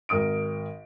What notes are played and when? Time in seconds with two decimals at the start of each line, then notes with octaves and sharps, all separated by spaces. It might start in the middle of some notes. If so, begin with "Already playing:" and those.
0.09 G#1 A#4 D#6 D7